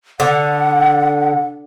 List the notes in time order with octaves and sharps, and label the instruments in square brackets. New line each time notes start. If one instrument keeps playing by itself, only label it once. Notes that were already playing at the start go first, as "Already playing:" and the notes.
[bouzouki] D3 [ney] F#5